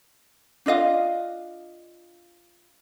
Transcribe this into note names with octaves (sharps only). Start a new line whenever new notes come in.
D4 F4 D#5 F5